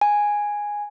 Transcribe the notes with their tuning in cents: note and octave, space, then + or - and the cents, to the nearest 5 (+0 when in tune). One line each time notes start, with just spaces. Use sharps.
G#5 -5